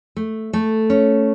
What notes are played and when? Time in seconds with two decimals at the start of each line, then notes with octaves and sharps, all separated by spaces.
0.16 A3
0.53 A3
0.90 C#4